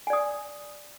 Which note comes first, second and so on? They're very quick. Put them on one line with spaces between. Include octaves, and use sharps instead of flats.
G#5 D5 D#6